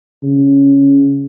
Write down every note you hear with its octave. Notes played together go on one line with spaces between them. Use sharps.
C#3